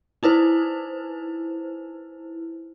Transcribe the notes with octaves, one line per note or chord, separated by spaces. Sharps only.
D#4 E4 B4 C5